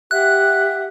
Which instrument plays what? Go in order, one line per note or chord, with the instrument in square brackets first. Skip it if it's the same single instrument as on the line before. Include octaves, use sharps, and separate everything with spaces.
[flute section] G4 E5 F#5 [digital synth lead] F#6